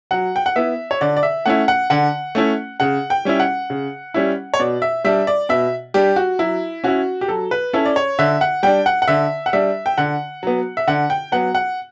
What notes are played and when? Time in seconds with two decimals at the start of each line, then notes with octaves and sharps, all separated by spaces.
0.11 F#3 F#5
0.36 G5
0.46 F#5
0.56 B3 E4 E5
0.91 C#5
1.01 D3 D5
1.17 D5
1.23 E5
1.46 A3 C#4 E4 F#5
1.68 F#5
1.90 D3 F#5
2.35 A3 C#4 E4
2.80 C#3 F#5
3.10 G5
3.25 G3 C#4 E4
3.40 F#5
3.70 C#3
4.14 G3 C#4 E4
4.54 C#5
4.59 B2 D5
4.82 E5
5.04 G3 D4 E5
5.27 D5
5.49 B2 E5
5.94 G3 D4 G4
6.16 F#4
6.39 F#3 E4
6.84 C#4 E4 F#4
7.21 G4
7.28 F#3 A4
7.51 B4
7.73 C#4 E4 A4
7.85 D5
7.96 C#5
8.19 D3 E5
8.41 F#5
8.63 G3 D4 G5
8.86 F#5
9.02 F#5
9.08 D3 E5
9.46 F#5
9.53 G3 D4 E5
9.86 G5
9.98 D3 F#5
10.43 F#3 B3
10.77 E5
10.87 D3 F#5
11.10 G5
11.32 F#3 B3 F#5
11.55 F#5